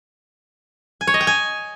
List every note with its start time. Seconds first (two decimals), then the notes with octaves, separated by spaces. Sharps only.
1.01 G#5
1.07 C#5
1.14 D#5
1.21 G5
1.27 G#5